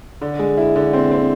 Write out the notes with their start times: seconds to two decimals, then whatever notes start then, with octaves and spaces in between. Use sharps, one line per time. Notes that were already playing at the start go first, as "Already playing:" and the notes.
0.22 D3
0.39 G#3
0.57 E4
0.76 D3
0.93 C4
1.11 C4